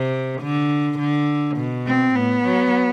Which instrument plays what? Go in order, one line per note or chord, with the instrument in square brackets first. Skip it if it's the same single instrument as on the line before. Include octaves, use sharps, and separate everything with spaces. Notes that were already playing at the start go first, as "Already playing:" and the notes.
Already playing: [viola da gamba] C3
D3
D3
B2
[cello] C4
[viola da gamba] A2 [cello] B3
[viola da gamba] F#3